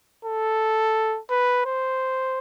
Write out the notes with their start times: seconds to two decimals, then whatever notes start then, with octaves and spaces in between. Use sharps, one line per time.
0.25 A4
1.30 B4
1.65 C5